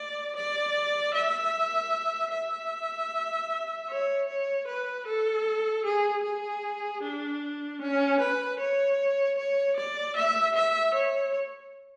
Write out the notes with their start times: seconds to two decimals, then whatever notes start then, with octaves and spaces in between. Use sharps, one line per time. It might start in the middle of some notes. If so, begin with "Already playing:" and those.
Already playing: D5
0.36 D5
1.14 E5
2.32 E5
3.89 C#5
4.28 C#5
4.67 B4
5.06 A4
5.85 G#4
6.24 G#4
7.02 D4
7.81 C#4
8.20 B4
8.59 C#5
9.38 C#5
9.77 D5
10.16 E5
10.55 E5
10.94 C#5